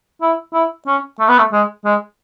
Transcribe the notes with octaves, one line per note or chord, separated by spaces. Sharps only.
E4
E4
C#4
A3
B3
A3
G#3
G#3